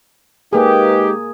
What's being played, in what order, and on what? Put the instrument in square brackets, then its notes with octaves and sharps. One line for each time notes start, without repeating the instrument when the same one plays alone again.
[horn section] G#3 D#4 G4 [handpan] A#3 G#4 [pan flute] B4